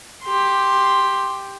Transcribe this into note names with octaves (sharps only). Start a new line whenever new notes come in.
G4 C6